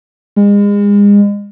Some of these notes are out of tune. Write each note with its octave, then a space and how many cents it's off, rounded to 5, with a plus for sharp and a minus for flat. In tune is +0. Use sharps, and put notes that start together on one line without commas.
G#3 -35